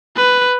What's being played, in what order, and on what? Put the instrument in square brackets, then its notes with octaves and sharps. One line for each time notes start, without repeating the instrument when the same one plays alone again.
[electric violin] B4